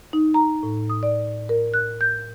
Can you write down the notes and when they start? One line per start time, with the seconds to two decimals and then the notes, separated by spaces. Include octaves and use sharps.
0.13 D#4
0.34 A#5
0.63 A2
0.90 D#6
1.03 D5
1.49 A#4
1.74 F#6
2.01 G6